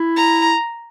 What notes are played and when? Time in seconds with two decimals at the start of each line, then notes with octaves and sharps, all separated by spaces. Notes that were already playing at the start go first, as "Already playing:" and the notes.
Already playing: E4
0.17 A#5